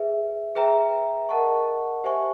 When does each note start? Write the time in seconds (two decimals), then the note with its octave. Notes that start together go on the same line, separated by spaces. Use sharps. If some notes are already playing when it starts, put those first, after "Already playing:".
Already playing: G#4 B4 E5
0.55 G#4 B4 E5 G5 A#5
1.29 A#4 D#5 F#5 A5 C#6
2.04 G4 C5 E5 G#5 C#6